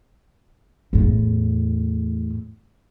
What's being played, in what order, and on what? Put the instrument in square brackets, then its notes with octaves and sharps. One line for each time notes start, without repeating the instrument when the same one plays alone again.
[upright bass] E2 A2